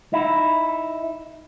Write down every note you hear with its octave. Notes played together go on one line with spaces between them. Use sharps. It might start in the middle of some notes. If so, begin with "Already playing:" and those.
D#4 E4